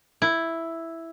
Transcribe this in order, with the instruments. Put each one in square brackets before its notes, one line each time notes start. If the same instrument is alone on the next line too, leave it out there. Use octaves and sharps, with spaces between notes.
[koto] E4